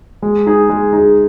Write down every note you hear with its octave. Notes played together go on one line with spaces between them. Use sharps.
G#3
D#4 G#4
G#3
D#4 G#4